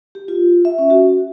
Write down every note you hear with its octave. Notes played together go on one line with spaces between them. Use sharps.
G4
F4
E5
C#4
F#4